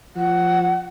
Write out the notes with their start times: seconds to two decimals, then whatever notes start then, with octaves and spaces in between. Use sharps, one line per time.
0.16 F3 F#5